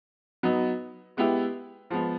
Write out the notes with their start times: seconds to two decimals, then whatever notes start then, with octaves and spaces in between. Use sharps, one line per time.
0.43 F#3 B3 D#4
1.17 G#3 B3 E4 G4
1.90 F3 G#3 B3